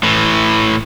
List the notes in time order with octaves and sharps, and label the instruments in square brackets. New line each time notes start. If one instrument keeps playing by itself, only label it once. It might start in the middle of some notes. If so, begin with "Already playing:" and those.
[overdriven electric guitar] A2 E3